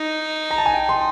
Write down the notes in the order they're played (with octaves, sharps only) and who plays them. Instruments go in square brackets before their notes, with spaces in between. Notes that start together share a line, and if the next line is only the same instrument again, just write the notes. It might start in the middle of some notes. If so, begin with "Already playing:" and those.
Already playing: [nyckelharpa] D#4
[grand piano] A#5
A5
G#5
G5
C6